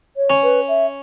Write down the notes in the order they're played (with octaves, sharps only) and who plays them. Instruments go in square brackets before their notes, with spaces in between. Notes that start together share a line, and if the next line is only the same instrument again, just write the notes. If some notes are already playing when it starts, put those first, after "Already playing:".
[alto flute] C#5
[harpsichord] C#4
[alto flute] B4
E5